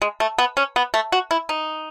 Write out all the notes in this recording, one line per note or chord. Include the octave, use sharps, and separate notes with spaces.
G#3
A3
B3
C#4
B3
A3
F#4
E4
D#4